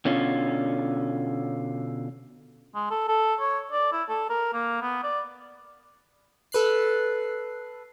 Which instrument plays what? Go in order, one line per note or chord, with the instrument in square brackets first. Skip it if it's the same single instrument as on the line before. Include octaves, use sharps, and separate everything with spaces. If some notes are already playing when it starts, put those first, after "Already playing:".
[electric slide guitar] B2 D3 C#4 F4
[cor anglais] G#3
A4
A4
C#5
D5
E4
A4
A#4
A#3
B3
D5
[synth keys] A4 B4 F#6 C7